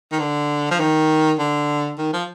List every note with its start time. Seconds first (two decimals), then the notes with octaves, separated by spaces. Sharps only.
0.12 D#3
0.20 D3
0.71 F3
0.80 D#3
1.39 D3
1.98 D#3
2.13 F3